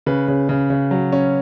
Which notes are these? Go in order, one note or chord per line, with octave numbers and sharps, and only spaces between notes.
C#3 B4
C#3
C#3
C#3
F#3
C#4